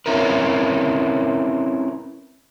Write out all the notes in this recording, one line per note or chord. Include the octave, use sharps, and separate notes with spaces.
C4 C#4 E4 A#4 B4